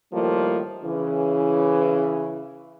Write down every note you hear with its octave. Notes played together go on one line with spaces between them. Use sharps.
A2 D#3 F3 G3 A#3
C#3 E3